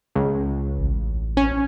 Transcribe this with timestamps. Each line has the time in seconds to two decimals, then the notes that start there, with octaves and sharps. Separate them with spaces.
0.15 C#2
0.79 A1
1.37 C#4